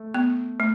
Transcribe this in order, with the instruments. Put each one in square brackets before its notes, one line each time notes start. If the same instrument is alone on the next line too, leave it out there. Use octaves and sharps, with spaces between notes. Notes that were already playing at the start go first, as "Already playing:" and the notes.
Already playing: [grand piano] A3
[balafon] B3
A3